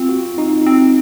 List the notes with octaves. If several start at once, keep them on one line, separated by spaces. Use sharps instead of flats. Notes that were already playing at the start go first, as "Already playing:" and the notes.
Already playing: C4 F4
F#4
D#4
C4